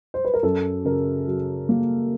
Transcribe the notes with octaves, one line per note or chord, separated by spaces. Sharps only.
C5
B4
A#4
F#2 A4
C#3 A#4
F#3
A#3